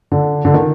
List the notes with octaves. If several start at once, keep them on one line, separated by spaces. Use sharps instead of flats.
D3
D3
D#3